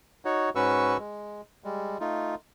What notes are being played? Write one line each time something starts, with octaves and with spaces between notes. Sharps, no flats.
D#4 F#4 C#5
G#2 C#4 F#4 B4 C#6 E6
G#3
G3 G#3
A3 D#4 F4